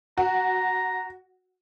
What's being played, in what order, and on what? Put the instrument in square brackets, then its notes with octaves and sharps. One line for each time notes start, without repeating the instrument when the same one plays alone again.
[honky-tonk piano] F#4 [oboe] A#5